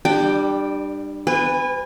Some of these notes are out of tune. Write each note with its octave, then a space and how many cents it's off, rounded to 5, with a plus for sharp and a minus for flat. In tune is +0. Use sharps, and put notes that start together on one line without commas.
G3 +0 D4 +35 G5 +0
B3 +45 B4 +0 G#5 -30